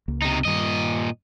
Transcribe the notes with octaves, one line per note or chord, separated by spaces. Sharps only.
C#2 A#3
C3 D#4
G2 A#2 D#3 G3 D#5